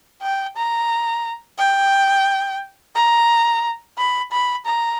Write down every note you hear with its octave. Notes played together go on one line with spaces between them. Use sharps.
G5
A#5
G5
A#5
B5
B5
A#5